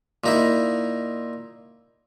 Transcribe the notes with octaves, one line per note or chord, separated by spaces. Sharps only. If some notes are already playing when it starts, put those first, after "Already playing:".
A#2 D#4 E4